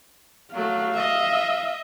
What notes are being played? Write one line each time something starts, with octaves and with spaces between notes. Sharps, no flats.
F#3 A3 F5
D#5 E5